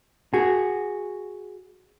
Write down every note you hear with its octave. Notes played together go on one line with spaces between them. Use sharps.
F#4 G#4